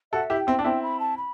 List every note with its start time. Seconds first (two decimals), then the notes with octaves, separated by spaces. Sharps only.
0.12 F#4 A4 E5
0.30 E4 G4
0.39 G5
0.47 C4 E4
0.59 D4
0.64 C4 E4 G5
0.83 B5
1.00 A5
1.17 B5